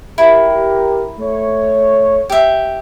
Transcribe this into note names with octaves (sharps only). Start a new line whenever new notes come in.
E4 G4 A#4
A3 C#5
G4 E5